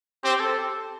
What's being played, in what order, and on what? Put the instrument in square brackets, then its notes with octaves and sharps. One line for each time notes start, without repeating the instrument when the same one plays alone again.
[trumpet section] C4 [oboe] G4
[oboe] A4